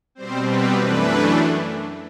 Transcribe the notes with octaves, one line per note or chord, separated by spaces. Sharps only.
B2 G3 C4 C5
B4
F#2 E3 A3 D4 B4